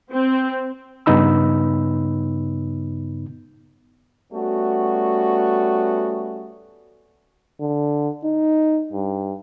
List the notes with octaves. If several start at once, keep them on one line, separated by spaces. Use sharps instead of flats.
C4
G2 C#3 B3 D#4 B5 E6
G3 A3 B3 C#4 F#4
D3
D#4
G2